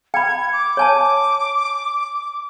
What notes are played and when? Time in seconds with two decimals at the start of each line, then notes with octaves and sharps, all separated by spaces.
0.14 G5 B5 G#6
0.52 D6
0.77 C#5 G#5 A5